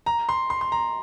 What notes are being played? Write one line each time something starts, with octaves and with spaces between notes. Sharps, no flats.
A#5
C6
C6
C6
A#5